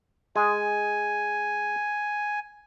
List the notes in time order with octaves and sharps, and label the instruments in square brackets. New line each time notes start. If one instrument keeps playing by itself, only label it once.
[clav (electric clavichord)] G#3 G#4 [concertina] G#5